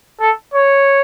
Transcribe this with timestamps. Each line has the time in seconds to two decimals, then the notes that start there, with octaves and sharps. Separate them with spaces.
0.20 A4
0.54 C#5